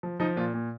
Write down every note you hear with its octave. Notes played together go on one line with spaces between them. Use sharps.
F3
F3 D#4
A#2 F4
A#2